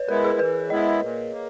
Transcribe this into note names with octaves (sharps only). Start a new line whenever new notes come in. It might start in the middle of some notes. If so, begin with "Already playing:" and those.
Already playing: B4 C#5
G#3 B3 E4 A#4
G#4
E3 B4
G#3 B3 E4 D#5
A#2
A#3